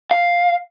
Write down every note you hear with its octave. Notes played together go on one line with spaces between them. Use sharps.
F5